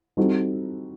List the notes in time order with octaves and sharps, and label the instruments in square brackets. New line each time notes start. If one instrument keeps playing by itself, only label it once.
[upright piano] G3 C4 D#4 F#4 A4